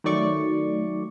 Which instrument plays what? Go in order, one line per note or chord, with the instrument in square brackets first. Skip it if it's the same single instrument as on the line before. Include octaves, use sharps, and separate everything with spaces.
[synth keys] D#3 F#3 A3 D5 C#6